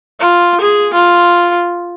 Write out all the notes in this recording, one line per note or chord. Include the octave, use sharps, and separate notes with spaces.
F4
G#4
F4